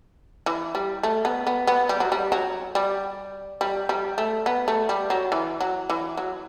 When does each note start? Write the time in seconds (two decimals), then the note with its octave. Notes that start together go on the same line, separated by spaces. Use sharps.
0.46 E3
0.75 G3
1.03 A3
1.25 B3
1.47 B3
1.67 B3
1.89 G3
2.00 F#3
2.12 G3
2.32 F#3
2.75 G3
3.61 G3
3.89 G3
4.18 A3
4.46 B3
4.68 A3
4.89 G3
5.10 F#3
5.32 E3
5.61 F#3
5.90 E3
6.17 F#3